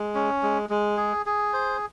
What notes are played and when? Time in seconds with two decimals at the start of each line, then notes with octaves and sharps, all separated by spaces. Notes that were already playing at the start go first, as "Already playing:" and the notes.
Already playing: G#3
0.15 C#4
0.43 G#3
0.70 G#3
0.97 G#4
1.26 G#4
1.53 C5